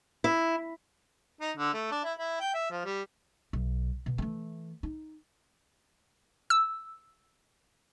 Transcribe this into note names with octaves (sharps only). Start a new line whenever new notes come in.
E4
D#4
D3
A3
D4
E4
E4
G5
E5
F3
G3
B1
B2
E3 A3
D#4
E6